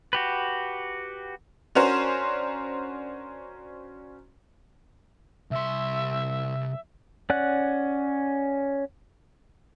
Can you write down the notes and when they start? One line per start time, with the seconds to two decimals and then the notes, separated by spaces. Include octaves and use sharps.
0.13 F#4 G4 B4
1.75 C#4 D4 F#4 A#4 C5
5.51 C2 E5 C6
7.30 C#4 D5 F#5 F#6